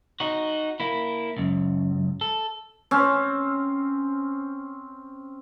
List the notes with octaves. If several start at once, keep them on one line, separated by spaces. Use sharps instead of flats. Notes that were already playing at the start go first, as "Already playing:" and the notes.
D#4 F#4
A#3 E4
C#2 F#2
A4
C4 C#4